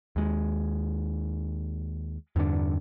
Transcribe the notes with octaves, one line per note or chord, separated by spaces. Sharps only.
D#2 G#3
E2 G2 D3 D4